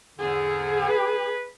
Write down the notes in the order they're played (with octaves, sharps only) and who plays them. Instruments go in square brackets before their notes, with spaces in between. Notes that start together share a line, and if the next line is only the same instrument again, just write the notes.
[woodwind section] E2 G#2 D3 [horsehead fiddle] G#4
[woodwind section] B4